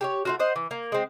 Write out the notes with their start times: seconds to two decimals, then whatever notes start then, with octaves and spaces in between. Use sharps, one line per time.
0.01 G4 A4 C#5
0.25 A3 F4 F#4
0.40 C5 D#5 F#5
0.56 E3
0.71 A#3
0.92 G#3 C4